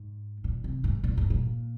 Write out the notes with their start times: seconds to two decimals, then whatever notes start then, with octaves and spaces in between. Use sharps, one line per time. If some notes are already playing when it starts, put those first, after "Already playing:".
Already playing: G#2
0.44 A#2
0.64 C3
0.84 G#2
1.04 A#2
1.17 G#2
1.30 A#2